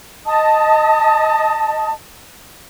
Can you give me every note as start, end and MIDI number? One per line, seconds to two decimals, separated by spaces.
0.25 1.91 75
0.25 1.91 81
0.25 1.91 87